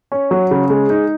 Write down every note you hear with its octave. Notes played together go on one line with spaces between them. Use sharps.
C#4
F#3
C#3
G#3
D#4